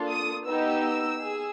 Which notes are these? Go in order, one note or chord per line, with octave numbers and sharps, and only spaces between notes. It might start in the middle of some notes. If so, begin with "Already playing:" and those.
Already playing: A#3 D4 F4 A4
D#6
B3 D#4 G4 E6
G#4